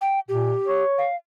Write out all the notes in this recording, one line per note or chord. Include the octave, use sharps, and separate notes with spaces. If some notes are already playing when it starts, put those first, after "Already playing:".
G5
A#2 G4
C#5
F5